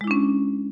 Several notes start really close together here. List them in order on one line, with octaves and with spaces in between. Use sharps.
G#3 E4 D4 C#4